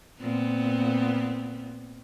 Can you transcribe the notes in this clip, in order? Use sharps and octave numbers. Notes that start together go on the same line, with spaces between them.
A#2 B3 C4